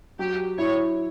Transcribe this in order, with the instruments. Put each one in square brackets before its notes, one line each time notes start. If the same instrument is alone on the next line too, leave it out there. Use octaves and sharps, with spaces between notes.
[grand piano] F#3 [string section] G4
[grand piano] E4 [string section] C#5